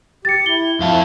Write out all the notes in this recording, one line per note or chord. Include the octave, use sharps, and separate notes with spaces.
G4 A6 C#7
E4 G7
F2 A3 E4 F5 A5